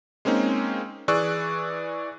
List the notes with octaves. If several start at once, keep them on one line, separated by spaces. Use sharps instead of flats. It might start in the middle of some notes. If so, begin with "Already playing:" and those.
G#3 A#3 C4 C#4 D#4
E3 G#4 D5 C#6 E6 F#6